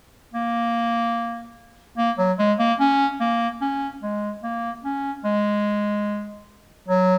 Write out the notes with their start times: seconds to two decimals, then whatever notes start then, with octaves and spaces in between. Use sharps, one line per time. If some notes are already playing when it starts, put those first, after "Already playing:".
0.33 A#3
1.98 A#3
2.18 F#3
2.39 G#3
2.59 A#3
2.80 C#4
3.20 A#3
3.61 C#4
4.02 G#3
4.43 A#3
4.84 C#4
5.24 G#3
6.88 F#3